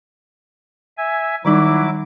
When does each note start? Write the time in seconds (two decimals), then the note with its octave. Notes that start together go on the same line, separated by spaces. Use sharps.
0.97 E5 G#5
1.45 D#3 F#3 G3 D#4 E4 D6